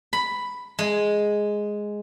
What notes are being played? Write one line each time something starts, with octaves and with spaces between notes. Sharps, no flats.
B5
G#3